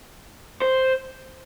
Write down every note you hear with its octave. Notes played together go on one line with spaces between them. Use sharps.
C5